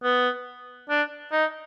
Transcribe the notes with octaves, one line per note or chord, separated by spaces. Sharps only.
B3
D4
D#4